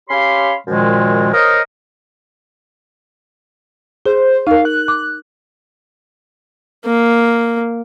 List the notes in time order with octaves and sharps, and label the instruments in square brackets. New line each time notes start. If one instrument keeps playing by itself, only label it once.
[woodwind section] C#4 G4 C#5 F5 B5 C6
F#2 A#2 D#3 F3 G#3
A#4 C5 C#5 D#5
[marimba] G#4 [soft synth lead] C5
[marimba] D#4 A#4 [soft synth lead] F5
[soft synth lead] F#6
[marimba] D6
[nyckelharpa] A#3